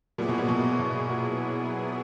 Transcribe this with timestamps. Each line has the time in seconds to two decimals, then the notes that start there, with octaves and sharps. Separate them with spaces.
0.18 A#2 F#3 B3 E4 G#4
0.29 B2
0.38 A#2
0.48 B2
0.79 B2
1.10 A#2